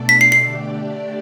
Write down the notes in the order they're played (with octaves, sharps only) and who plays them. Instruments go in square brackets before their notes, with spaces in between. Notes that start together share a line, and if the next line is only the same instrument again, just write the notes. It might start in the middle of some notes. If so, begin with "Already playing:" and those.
Already playing: [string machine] B2 A3 D4 A4 D5
[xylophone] B6
C7
C7
[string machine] D3 A3 D4 G4 D5